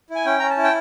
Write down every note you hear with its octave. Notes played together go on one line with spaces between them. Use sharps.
E4
G#5
C#4 G5
C#4 A#5
A5
E4
G5